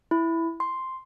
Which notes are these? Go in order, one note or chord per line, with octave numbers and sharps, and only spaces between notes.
E4
C6